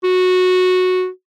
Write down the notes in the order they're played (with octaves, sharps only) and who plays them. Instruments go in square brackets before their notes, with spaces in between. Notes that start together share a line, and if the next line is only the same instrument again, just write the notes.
[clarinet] F#4